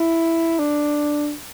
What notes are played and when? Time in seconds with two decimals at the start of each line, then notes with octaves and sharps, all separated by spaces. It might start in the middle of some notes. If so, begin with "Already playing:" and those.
Already playing: E4
0.59 D4